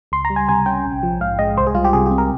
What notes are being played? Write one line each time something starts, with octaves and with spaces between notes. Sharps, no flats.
C#2 C6
A#5
G3
G#5
C3 G#5
C#4 G5
A#1
F3
G#2 F5
G#3 D#5
C2 C5
G#4
G3 F4
G4
C3 G#4
G4
C4
A#4